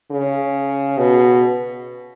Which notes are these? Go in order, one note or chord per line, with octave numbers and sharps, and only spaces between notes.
C#3
B2